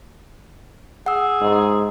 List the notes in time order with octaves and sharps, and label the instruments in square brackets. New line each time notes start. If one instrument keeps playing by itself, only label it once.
[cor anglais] G#4 [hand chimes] F#5 E6
[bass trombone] G#2